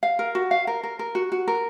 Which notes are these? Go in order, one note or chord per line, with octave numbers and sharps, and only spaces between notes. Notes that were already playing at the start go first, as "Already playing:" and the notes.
F5
A#4
F#4
F5
A#4
A#4
A#4
F#4
F#4
A#4